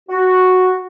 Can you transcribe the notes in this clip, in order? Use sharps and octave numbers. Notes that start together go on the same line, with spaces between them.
F#4